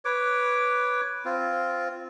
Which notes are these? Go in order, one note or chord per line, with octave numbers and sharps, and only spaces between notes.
B4 C#5 D6
C4 F4